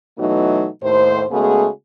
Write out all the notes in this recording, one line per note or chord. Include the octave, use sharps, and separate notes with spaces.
B2 E3 F#3 A3 D#4
D#2 A2 C5
C#3 G#3 A3 B3 F#4 G#4